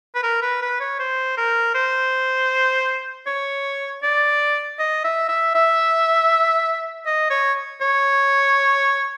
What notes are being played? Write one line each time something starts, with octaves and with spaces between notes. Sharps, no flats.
B4
A#4
B4
B4
C#5
C5
A#4
C5
C#5
D5
D#5
E5
E5
E5
D#5
C#5
C#5